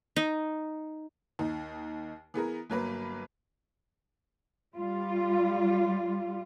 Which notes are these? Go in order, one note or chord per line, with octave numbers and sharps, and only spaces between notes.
D#4
D#2 D#4
E3 B3 G#4 A#4
G1 F#3 A#3 B4
G3 F4